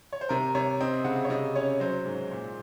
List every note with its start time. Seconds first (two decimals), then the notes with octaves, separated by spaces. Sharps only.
0.13 C#5
0.21 C5
0.29 C3 A#4
0.55 C3 C#5
0.81 C4 D#5
1.04 C#3 F#5
1.25 C#5
1.30 C3 D#5
1.55 C#4 C#5
1.80 F#3 C5
2.06 G#2
2.31 A#2